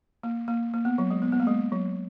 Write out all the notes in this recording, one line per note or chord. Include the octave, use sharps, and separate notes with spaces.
A#3
A#3
A#3
B3
F#3
G#3
B3
B3
A#3
G#3
F#3